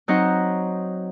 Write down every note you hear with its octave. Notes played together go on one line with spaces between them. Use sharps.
F#3 C4 D#4 C5 D#5 F#5